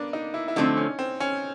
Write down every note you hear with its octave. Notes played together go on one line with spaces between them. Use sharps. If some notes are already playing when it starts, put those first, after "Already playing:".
Already playing: A#3 B3 D4
D#4
E4
E4
D3 F3 A3 C4 D#4
C#4
C4
C#4